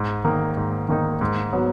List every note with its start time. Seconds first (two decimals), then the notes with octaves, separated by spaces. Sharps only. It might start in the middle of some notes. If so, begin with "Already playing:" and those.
Already playing: G#2
0.24 D#3 A#3 D#4
0.57 G#2
0.89 D#3 A#3 D#4
1.21 G#2
1.53 F#3 B3